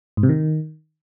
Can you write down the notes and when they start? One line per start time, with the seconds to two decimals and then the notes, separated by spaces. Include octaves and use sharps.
0.17 G#2
0.23 C3
0.29 D#3